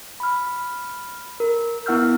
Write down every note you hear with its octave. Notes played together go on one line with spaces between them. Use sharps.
B5 F6
A#4
B3 E4 F#5 E6 F6 G6